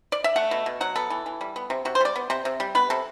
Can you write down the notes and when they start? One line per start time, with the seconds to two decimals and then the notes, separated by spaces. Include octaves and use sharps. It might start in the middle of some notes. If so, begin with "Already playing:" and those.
0.12 D5
0.24 E5
0.36 A3 F#5
0.51 B2
0.66 B2
0.81 F#3 F#5
0.96 B3 A4
1.10 E3
1.26 E3
1.41 G3
1.56 B3
1.70 C3
1.85 C3 F#4
1.95 C5
2.01 G3 D5
2.16 B3
2.30 C3 C5
2.45 C3
2.60 G3
2.75 B3 B4
2.90 C3 A4